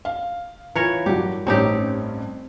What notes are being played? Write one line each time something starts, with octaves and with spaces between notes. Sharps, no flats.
F5
E3 F4 A#4 B4 C#5
G2 F#3 G4
A1 G2 C4 C#4 D#4 G4